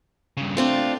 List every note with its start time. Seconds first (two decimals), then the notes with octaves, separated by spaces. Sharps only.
0.37 G2 C#3
0.57 A3 C4 D4 F4